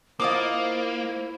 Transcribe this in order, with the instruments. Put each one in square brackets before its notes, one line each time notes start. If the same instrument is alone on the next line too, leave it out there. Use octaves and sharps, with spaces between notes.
[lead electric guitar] A#3 [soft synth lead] E4 [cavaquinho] F4 D#5 D6 [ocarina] C5